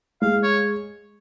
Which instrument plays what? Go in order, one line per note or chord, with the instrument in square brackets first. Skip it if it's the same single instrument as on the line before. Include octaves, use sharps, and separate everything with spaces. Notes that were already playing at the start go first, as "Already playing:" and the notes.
[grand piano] G#3 [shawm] F5
[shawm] C#5